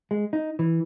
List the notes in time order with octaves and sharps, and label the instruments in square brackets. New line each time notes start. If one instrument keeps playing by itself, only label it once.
[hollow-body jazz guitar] G#3
D#4
E3